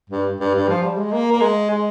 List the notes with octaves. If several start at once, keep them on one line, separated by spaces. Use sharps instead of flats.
G2
G2
G2
F3
G3
G#3
A#3
A#3
G#3
G#3